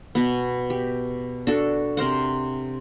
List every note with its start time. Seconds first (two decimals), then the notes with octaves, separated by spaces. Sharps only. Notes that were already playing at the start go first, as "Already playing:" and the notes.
0.15 B2 B3
0.70 G4
1.47 D4 F#4 A4
1.97 C3 A#4 C5 F#5